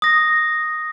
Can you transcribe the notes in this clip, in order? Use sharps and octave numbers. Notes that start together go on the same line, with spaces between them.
D#6 A#6